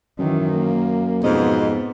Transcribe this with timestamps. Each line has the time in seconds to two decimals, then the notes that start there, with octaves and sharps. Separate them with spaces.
0.19 F#2 D#3 E3
0.52 A#3
1.23 F2 G#2 B2 B3 D#5